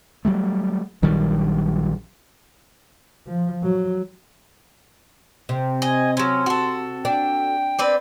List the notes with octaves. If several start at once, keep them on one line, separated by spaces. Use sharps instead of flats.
F#3 G3 A3
A#1 D#3 F#3 G3
F3
F#3
C3
D#5 G#5
F#3 C#4 C6
F#4 A4
D4 G5
C4 B4 D5